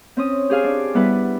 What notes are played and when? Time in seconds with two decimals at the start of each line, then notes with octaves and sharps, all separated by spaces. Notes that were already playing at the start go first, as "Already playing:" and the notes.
0.17 C4 C#4 D#6
0.50 G4 G#4 F5 G#5
0.64 D4 D5
0.94 G3 B3 E4 B4